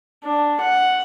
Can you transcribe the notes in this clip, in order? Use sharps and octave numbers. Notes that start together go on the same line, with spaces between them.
D4
F#5